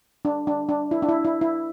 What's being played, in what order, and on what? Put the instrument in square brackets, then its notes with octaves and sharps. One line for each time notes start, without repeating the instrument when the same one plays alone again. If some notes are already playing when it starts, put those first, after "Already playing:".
[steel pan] D4
D4
D4
E4
D4
E4
E4
E4